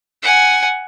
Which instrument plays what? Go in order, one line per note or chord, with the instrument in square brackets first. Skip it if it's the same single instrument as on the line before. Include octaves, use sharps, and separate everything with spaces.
[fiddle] F#5 G#5